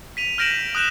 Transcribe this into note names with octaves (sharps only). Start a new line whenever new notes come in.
B6 D#7 F7
F6 G6 A#6 D7 E7 F#7
D#6 F#6 G6 E7